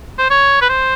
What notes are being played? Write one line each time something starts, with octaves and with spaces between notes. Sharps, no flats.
C5
C#5
B4
C5